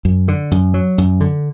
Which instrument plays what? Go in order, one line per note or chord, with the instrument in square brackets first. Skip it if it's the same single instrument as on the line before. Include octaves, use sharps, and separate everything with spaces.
[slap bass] F#2
D3
F#2
F#3
F#2
D3